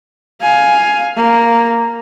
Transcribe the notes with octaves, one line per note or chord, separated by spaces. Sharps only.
F5 G#5
A#3